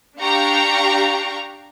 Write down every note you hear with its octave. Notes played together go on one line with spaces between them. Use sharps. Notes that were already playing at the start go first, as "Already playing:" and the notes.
D4 G4 F5 G5 A#5 C#6